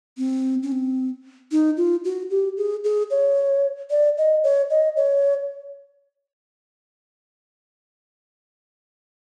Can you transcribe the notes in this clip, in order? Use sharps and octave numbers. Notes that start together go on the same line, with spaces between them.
C4
C#4
C4
D#4
F4
F#4
G4
G#4
G#4
C#5
D5
D#5
C#5
D#5
C#5